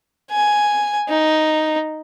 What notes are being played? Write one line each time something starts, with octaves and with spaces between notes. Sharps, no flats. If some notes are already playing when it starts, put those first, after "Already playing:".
G#5
D#4